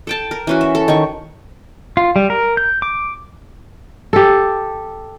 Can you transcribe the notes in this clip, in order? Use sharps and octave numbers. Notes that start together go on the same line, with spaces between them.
A4 G5 A5
A#4
E3 C#4 F#4
E5
A4
D#3 C#5 C#6
F4
G3
A#4
G6
D6
G4 A4